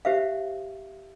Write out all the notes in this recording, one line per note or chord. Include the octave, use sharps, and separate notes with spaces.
G4 C5 E5 F5